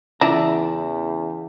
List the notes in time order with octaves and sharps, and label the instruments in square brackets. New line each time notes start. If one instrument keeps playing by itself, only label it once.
[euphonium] E2 [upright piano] C#3 E3 [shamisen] D4 [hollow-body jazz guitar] E5 A#5